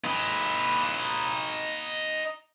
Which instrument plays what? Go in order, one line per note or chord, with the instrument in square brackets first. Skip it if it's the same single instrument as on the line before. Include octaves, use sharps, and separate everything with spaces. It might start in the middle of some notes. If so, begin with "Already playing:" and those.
[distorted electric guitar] D#4 B4